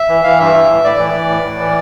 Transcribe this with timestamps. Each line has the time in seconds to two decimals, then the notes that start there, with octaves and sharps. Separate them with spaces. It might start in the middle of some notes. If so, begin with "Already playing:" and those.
Already playing: E5
0.09 E3
0.23 E3 F5
0.39 G2 E5
0.54 E3
0.69 A2
0.84 A2 D5
0.99 E3
1.14 E3
1.29 A2
1.45 A2
1.59 E3